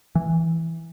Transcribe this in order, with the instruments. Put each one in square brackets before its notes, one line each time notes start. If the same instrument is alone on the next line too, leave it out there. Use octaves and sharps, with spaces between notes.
[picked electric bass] E3